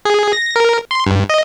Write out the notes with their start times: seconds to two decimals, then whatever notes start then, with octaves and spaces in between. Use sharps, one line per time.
0.05 G#4
0.33 A#6
0.56 A#4
0.91 C6
1.06 G2
1.30 D#5